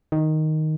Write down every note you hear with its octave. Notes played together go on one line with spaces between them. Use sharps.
D#3